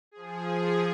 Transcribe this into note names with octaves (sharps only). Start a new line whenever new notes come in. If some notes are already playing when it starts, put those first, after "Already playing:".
F3 G#4